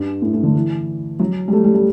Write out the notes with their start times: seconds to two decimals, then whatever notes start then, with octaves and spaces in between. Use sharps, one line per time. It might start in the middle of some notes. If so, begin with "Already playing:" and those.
Already playing: G2
0.22 A2
0.33 A2
0.43 D3
0.55 E3
1.19 F#3
1.48 G3
1.53 A3
1.64 G3
1.74 G3